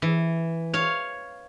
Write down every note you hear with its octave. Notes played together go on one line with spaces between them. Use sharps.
E3
C#5 F5